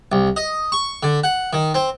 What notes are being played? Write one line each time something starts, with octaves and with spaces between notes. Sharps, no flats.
C2
D#5
C#6
D3
F#5
D#3
C4